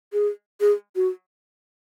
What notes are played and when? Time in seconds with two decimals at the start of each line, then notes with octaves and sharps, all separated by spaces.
0.13 G#4
0.61 G#4
0.96 F#4